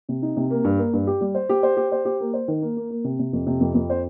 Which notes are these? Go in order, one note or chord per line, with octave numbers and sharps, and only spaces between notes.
C3
D#4
C3
A#3
G2
A#3
G2
G4
G3
C5
G4
C5
G4
C5
G4
A#3
C5
D#3
A#3
A#3
A#3
C3
C3
F2
C3
F2
F2
C5